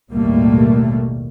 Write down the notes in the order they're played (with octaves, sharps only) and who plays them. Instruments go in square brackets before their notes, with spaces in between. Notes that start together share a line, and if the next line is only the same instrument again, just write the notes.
[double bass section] A1 D#2 B2 G3 A3 A#3